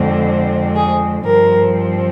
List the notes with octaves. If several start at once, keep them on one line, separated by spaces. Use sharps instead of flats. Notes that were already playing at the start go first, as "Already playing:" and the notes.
Already playing: F2 D3 G#3 C4
G#4
G2 F3 C4 A#4